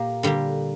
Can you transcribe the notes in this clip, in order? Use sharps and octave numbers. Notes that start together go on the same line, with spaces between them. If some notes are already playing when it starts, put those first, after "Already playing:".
Already playing: A#2 A#3 G4
D3 G3 A#3